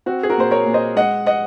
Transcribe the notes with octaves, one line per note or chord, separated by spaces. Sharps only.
C4 F#4
G#4
F#4 A#4
A#2 C5
A#4 C#5
A#2
C5 D#5
G#3 D#5 F#5
D#5 F#5